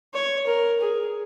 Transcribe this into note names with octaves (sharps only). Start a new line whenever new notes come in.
C#5
A#4
G#4